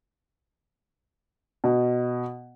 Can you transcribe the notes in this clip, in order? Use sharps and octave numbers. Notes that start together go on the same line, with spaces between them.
B2